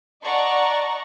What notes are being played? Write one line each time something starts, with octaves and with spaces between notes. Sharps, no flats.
D5 D#5 F#5 A5 A#5 C#6